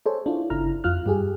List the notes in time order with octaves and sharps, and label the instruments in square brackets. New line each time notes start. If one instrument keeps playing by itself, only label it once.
[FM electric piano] G#4 A4 C5 C#5
D4 E4 F4
G1 C#3 E4 A#5 F6
F2 F4 F6 F#6
G2 G4 G#4